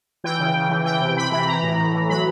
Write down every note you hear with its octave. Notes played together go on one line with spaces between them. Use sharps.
E3 G5
C#3
C#3
E3
E3 G5
C3
C3 B5
E3 B5
E3 A#5
A2
A2
E3
F#3 B5